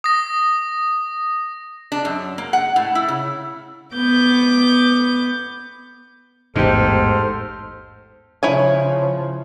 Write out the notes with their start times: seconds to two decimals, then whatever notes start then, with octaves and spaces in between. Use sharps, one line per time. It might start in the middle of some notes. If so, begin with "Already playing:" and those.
0.04 D#6 A#6
1.92 D4
2.05 F#2
2.38 A#3
2.53 F#5
2.76 A2
2.95 E4
3.08 C#3
3.94 B3 D6 G6
6.56 A1 E2 G#2 D#4 G4 A4 C5 F6
8.43 C#3 F3 E4 C#5 G#5